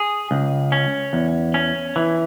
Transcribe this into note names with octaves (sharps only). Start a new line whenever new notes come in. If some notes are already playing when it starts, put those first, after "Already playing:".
Already playing: G#4
C#2
C#4
E2
C#4
E3